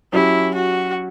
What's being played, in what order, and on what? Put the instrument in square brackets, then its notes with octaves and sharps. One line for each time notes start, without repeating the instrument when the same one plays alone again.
[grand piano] F#3 C#4 G4 [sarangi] E4
[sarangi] F#4